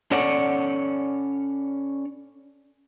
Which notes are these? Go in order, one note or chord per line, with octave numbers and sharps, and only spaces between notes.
C#4 A4 C#5 D5 F#5